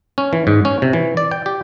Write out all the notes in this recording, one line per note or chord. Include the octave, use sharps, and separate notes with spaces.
C#4
E3
G#2
C#4
C3
E3
D5
G5
G4